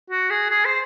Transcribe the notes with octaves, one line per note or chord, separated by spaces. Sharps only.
F#4
G#4
G#4
C5